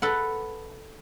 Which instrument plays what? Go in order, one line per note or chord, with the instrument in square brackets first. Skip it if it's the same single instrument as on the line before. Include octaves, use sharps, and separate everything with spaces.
[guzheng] A4 B4 F#5